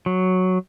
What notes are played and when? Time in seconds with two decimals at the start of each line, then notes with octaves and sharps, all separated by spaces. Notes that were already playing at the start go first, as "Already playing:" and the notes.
0.06 F#3